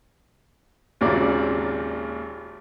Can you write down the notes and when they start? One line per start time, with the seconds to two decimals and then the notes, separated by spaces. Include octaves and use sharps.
1.01 G#1 D#2 A#2 C#3 D5